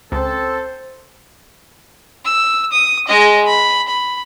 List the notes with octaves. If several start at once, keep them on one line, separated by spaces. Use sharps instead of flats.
C#2 C4 A4 C5
E6
D#6
G#3 D#5
B5
B5